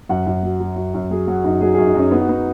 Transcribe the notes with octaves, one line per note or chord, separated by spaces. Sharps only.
F#2 F#5
F#2
F#3
F#3
F#2
F#2
F#3 G#4
F#3 F#4
F#2 D#4
F#3 G#4
G#4
F#2
D#4
F#2 C#4
B3 D#4
F#4
B3 D#4